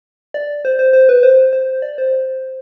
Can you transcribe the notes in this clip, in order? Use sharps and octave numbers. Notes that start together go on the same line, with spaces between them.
D5
C5
C5
C5
B4
C5
C5
D5
C5